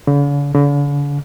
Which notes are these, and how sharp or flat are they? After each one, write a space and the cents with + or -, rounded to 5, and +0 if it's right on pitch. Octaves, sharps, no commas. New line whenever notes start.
D3 -45
D3 -40